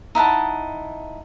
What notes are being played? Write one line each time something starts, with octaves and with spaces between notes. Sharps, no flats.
D#4 E4 F#5 A5